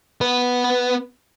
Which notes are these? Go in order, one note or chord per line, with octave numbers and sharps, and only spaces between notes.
B3 B4